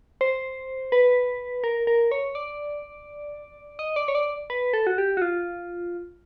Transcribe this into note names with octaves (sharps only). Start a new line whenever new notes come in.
C5
B4
A#4
A#4
C#5
D5
D#5
D5
C#5
D5
B4
A4
F#4
G4
F#4
F4